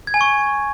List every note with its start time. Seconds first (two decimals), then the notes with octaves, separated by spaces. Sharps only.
0.07 G#6
0.14 G#5
0.21 C#6